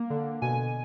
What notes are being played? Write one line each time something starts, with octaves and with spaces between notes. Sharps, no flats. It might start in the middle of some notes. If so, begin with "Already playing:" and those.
Already playing: A#3
D3
B2 G#5